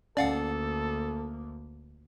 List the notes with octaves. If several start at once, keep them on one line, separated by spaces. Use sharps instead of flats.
D2 A#3 C#4 A4 D5 F5 F#5